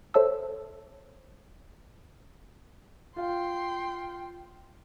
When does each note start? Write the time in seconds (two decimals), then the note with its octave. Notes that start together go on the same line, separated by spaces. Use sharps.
0.14 A4 C5 C#5 E5 A5 E6
3.16 F4 F5 G5 C6